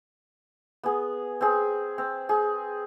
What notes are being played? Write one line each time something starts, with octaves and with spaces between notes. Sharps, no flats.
B3 G#4
C4 G#4
C4
G#4